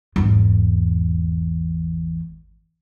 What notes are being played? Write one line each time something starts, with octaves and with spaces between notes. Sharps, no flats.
G#1 E2